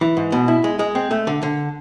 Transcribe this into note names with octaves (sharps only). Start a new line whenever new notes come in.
E3
G#2
B2
E4
G#3
G#3
C4
A3
D3
D3